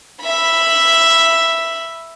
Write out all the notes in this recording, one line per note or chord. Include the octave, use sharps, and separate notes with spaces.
E5 B5